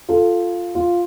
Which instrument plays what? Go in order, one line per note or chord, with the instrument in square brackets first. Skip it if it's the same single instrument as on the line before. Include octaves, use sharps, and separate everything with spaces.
[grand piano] F4 A4
F4